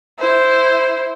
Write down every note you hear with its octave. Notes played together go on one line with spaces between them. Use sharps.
E4 C5